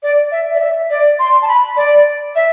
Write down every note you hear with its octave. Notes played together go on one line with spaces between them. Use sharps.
D5
E5
D5
E5
D5
C6
A5
B5
D5
E5